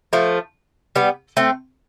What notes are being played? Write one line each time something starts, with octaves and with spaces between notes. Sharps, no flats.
F3 A3
G3 B3
A3 C4